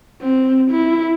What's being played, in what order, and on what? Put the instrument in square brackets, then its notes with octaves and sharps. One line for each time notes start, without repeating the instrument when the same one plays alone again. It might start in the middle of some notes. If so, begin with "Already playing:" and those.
[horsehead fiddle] C4
E4